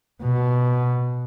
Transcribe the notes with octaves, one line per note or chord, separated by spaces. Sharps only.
B2